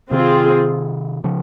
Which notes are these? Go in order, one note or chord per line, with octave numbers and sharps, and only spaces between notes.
C3 D#3 C4 F4 G#4
C#3 F3